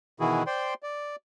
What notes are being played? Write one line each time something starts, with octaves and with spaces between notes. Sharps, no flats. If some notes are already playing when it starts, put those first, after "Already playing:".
B2 D#3 E3 E4 F#4 G#4
C5 D5 G5 C6
D5